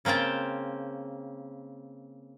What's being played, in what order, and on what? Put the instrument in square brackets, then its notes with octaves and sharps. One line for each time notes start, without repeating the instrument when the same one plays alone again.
[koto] C#3 A#3 C4 G5 A5